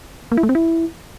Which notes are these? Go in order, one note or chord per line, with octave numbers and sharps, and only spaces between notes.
A#3
E4
A3
C4
E4